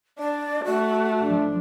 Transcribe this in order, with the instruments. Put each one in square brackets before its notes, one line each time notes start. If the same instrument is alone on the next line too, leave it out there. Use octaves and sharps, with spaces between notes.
[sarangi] D4 [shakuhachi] D5
[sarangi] A3 [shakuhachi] F#4
[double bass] F3 D4